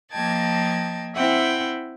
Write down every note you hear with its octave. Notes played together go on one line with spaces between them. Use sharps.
F3 A#3 D#5 G5 A5 G#6
C4 E4 E5 F#5 G5